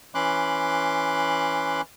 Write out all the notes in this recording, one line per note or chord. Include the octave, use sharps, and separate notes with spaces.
E3 C#4 B5 C6 D6 F#6